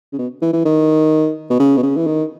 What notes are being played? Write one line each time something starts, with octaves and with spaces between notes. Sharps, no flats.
C#3
B2
E3
E3
D#3
B2
C#3
B2
C#3
E3
D#3